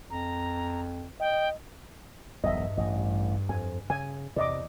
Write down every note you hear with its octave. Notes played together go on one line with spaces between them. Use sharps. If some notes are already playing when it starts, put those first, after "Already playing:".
F2 A#5
D#5 G5
E1 B1 E2 G2 D#5 E5
A1 D#5
F2 G#5
C#3 G#5
E2 C3 D5 D#5 D6